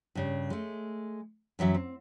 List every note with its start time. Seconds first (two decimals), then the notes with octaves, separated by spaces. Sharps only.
0.15 G2 C#3
0.50 G#3 A3
1.59 F#2 E3 F#3 E5
1.75 C4